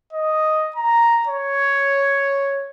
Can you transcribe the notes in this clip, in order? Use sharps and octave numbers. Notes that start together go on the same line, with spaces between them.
D#5
A#5
C#5